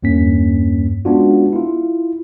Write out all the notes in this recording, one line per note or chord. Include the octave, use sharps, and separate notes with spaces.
E2 G2 A#3 C#4 B6
G#3 B3 C#4 D4 F4 F#4
E4 F4